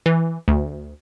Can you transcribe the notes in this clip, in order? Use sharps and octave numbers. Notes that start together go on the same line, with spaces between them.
E3
D2